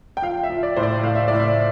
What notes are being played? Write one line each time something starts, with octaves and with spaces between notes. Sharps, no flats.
G5
F3 F5
E5
F3
D5
A2 C5
D5
A2 F5
E5
A2 D5
E5